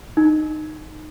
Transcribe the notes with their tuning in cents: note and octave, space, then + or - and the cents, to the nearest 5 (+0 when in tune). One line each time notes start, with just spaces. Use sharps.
D#4 -15